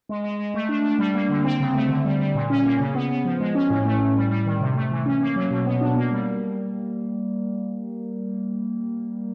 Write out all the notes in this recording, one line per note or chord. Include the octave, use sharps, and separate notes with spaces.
G#3
G#3
G#3
A3
D4
D4
G3
A#3
D3
C4
C#3
A3
D3
G3
G3
A#2
C#4
A#3
C#3
B3
B3
F3
G#3
C#4
A2
A3
A2
G3
G3
D#3
C3
A3
E3
C#4
A#3
F#3
B2
B3
D4
A#3
G3